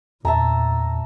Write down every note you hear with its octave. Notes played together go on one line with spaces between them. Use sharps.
E2 A#2 E5 A5 A#5